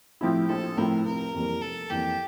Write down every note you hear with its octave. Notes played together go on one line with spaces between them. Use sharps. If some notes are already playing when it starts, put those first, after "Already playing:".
A2 F3 C4 E4 G4
A#1 A4
A2 F3 C4 E4 A#4
F1 A#4
F2 E3 G3 A#3
F1 A4
F2 E3 G3 A#3 G4